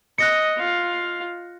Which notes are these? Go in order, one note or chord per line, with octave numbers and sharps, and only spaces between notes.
D#5 F#6 A#6 C#7
F4 F5